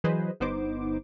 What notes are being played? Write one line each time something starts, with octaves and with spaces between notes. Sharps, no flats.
E3 F#3 G#4 B4 C5 D#5
G1 B3 D#4 C5 D6